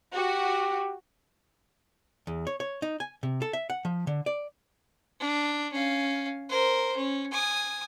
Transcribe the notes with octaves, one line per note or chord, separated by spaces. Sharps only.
F#4 G4
E2
C#5
C#5
D#4
G#5
C3
A4
E5
F#5
F3
D3
D5
D4
C#4 F5
A#4 C5
C#4
G#5 D#6